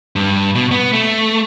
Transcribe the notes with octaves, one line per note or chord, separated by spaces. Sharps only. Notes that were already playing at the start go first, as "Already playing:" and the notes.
G2
B2
B3
A3